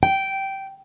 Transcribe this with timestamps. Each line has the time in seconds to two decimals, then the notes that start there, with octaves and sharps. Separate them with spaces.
0.03 G5